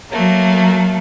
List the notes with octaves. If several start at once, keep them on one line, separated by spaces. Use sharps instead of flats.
F#3 A3 A#3